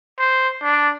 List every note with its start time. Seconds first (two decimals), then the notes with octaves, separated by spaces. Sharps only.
0.19 C5
0.63 D4